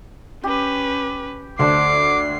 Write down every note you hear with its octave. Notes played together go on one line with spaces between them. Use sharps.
C#4 G4 B4
D2 D4 C5 D6 C7